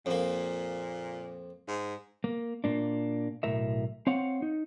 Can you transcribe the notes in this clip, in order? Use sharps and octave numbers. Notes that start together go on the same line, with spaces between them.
F2 A#2 A#3
G#2
A#3
A#2 A#3 D4
B1 A2 A#4 E5
C4 C#5 F5 F#5
D#4